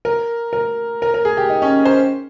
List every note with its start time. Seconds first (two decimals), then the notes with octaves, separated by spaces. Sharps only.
0.05 A#4
0.53 A#4
1.02 A#4
1.14 A#4
1.25 G#4
1.37 G4
1.50 D#4
1.62 C#4
1.85 C5